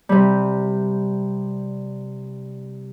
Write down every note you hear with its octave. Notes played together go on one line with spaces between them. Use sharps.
C3 G3